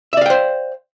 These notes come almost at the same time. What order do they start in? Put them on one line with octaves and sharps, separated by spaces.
E5 D5 F5 G5 C5